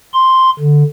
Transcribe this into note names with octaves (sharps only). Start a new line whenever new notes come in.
C6
D3